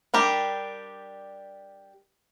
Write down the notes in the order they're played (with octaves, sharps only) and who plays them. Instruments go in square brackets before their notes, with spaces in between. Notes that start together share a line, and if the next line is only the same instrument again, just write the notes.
[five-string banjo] G3 D4 G4 A#4